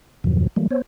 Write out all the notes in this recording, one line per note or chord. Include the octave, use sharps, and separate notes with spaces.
E2 G2 B2 D#3 F3 F#3
E3 F#3 G3 A3 A#3
B3 C5 C#5